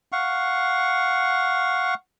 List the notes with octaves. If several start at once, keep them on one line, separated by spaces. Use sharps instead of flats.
F5 F#5 C#6